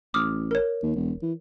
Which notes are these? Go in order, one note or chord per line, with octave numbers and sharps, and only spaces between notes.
A1 D6 D#6 F6
A#4 C#5
D#2
E1
E3